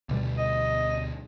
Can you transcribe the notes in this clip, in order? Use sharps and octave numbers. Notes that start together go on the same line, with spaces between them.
D2 B2 G3
D#5